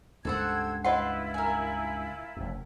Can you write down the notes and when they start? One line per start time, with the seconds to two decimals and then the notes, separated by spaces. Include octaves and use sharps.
0.25 C#2 G2 A4 C5 F#5 G5 E6 G#6
0.84 E4 F4 B4 D#5 E5 F#5 C6
1.34 A#4 G#5
2.37 F1 F#2